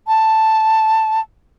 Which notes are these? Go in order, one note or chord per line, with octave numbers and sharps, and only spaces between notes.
A5